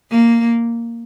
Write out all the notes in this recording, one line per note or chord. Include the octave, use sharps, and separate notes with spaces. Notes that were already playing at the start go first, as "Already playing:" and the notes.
A#3